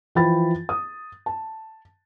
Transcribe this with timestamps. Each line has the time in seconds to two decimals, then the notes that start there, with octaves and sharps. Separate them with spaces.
0.15 E3 F3 F4 G5 B5 A6
0.69 D#6
1.26 A5